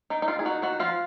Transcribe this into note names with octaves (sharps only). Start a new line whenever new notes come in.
D#3 D#4
D#4
D#3 F4
G#4
D#4 F#4
D#3 F#4
F3 F4